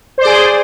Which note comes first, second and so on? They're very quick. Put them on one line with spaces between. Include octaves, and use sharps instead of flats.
C5 D5 G#4